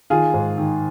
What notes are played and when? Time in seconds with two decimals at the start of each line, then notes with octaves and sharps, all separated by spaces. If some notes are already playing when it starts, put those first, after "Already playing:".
0.10 D#3 F4 G#4
0.34 G#2
0.58 D#3